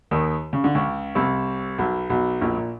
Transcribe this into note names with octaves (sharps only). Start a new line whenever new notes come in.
D#2 D#3
C#3
D3
C#2 C#3
C2 C3
B1 B2
B1 B2
A#1 A#2
A#2